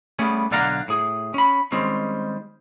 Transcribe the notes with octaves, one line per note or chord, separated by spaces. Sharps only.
G3 A3 B3 C#4 G#4
B1 D3 D5 F5 F#5 A#5
A2 G#4
C#4 B5
D#3 G3 G#3 C4 C#4